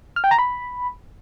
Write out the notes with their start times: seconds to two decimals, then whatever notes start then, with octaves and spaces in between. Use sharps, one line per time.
0.16 F6
0.24 G5
0.31 A#5
0.39 B5